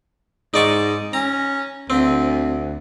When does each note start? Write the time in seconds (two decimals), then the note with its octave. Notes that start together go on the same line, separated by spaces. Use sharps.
0.54 G#2 D#4 D5 C#6
1.13 C#4 A#5
1.90 D2 C4